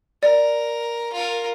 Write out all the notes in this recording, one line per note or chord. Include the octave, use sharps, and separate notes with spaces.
A#4 D5
F4 A#4